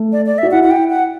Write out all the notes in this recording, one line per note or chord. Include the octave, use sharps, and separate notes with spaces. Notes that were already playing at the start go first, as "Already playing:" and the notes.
Already playing: A3
D5
D5
E5
F#4
E4 F#5
F#5
G5
F#5